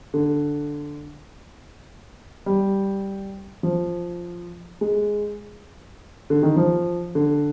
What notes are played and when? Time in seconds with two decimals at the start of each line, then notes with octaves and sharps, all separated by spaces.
0.14 D3
2.46 G3
3.63 F3
4.81 G#3
6.30 D3
6.43 D#3
6.56 F3
7.15 D3